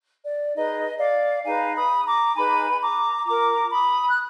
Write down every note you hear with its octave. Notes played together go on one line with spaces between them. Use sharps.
D5
D#4 G#4 B4 D#5
D5 F5
D#4 G#4 B4 F5 G#5
B5 D#6
A#5 D6
D#4 G#4 B4 G#5 B5
A#5 D6
F4 A#4 A#5 D6
B5 D#6
F#6